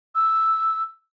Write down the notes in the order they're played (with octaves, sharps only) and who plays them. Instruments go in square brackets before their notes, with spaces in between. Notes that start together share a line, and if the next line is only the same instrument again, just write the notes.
[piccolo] E6